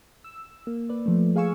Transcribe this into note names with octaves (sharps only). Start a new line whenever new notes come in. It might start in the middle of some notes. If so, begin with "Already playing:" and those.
E6
A#3
A#3 B4 D5
F3 A3
G#4 F5 G#5 C#6 E6